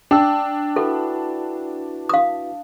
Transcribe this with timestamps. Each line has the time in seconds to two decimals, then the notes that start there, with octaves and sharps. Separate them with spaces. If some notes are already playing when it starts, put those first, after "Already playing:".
0.11 D4 G5 E6
0.76 E4 F#4 A4 B4
2.09 F5 D#6